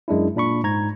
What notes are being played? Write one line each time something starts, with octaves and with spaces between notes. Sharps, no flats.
F#2 G#3 D4 E4
A#2 D4 B5 C#6
G#2 A#5 G#6